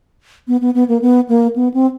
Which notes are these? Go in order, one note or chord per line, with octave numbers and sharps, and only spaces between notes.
B3
B3
B3
A#3
B3
A#3
B3
C4